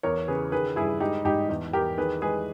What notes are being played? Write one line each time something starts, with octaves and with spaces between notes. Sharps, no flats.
E2 A#4 C#5
C#3 G#4 B4
D#3 G#4 B4
G2 E4 G#4
G#3 D#4 G4
G#2 D#4 G4
E2
E2 G4 A#4
D#3 G#4 B4
G#3 G#4 B4